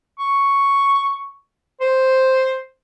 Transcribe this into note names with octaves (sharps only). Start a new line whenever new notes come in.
C#6
C5